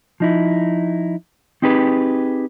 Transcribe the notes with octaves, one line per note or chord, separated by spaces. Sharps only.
F3 D#4 E4
C4 D#4 G4 G#4 B4